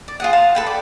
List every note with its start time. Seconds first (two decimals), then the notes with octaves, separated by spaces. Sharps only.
0.08 D5
0.20 F4 G#4 F#5
0.33 F5 A5 C6
0.55 A4 B4 G5
0.66 D5